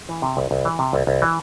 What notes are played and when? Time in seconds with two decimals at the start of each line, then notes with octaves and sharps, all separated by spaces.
0.09 E3
0.22 C3
0.37 C2
0.51 C2
0.65 E3
0.79 C3
0.93 C2
1.07 C2
1.22 E3